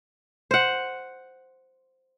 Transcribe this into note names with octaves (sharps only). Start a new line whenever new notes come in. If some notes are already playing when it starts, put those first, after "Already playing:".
C5 F#5